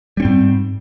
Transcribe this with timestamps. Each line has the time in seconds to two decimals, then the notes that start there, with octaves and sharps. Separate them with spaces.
0.17 G3
0.20 C#4
0.22 C4
0.25 G#2